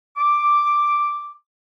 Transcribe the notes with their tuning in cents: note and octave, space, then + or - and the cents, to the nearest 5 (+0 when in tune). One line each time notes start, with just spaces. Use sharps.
D6 +0